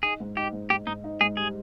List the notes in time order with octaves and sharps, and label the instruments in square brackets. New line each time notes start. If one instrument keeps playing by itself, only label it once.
[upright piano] D#4 [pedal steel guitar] G#4
[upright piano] G#2
[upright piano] D#4 [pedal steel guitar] G4
[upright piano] G#2
[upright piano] G#2 [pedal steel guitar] G4
[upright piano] G#2 [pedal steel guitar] D#4
[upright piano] D#4
[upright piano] G#2 [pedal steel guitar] G#4
[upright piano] G3 [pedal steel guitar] G#4